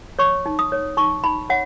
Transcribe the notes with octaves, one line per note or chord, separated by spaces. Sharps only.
C#5 C#6
D#4
D#6
C#5
D#4 C#6
D#4 B5
C#5 F#5